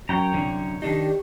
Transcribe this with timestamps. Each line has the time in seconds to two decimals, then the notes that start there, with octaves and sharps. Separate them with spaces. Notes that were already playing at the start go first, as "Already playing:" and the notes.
0.09 F#2 C#5 G5 A#5
0.34 C2 F#2 D3
0.82 D#3 D4 D#4 G4